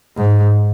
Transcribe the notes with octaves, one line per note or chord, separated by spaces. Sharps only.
G#2